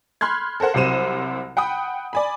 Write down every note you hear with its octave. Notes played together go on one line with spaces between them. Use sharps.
B5 C6 F6 F#6 G#6
A4 A#4 C5 F#5
C2 C3 F#3 C5 D#7 E7
F#5 G5 B5 D#6
D5 G#5 B5